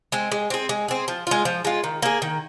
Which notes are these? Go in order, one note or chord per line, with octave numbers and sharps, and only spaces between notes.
G#3 C4
G#3
C4 G#4
G#3
C4 G#4
F3
G#3 F4
F3
G#3 F4
D#3
A#3 G#4
D#3